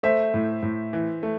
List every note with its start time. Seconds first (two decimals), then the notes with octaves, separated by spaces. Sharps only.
0.03 A3 C5 E5
0.34 A2
0.63 A2
0.93 E3
1.23 A3